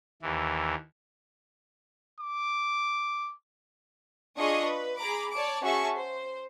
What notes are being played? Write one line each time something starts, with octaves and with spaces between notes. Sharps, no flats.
D#2 E3
D6
D4 F4 G#4 D#5 C#6 D#6
B4
G#4 A#5 B5 D6
C#5 D5 A5 D6
C#4 F#4 G#4 E5 A5 C#6
C5